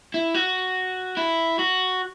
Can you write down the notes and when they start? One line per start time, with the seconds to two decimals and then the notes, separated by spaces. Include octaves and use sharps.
0.14 E4
0.35 F#4
1.17 E4
1.59 F#4